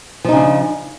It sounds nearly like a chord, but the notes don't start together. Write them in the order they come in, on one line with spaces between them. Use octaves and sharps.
F3 D#4 C#3 D4